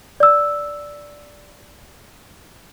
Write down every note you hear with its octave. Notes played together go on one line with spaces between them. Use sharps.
D5 E6